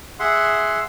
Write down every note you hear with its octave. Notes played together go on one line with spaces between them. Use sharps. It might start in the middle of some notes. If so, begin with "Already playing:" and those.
G#4 E5 F#5 C6